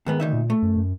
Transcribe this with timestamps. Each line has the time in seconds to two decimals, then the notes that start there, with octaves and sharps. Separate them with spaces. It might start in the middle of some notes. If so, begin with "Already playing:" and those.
0.06 D#2 G#2 D#3 B3
0.20 D2 D#4 E5
0.33 A#2
0.50 A3
0.62 F#2
0.77 F#2